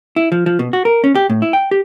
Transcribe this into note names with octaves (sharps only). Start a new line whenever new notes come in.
E4
F3
F3
B2
F#4
A#4
C#4
G4
A2
E4
G5
G4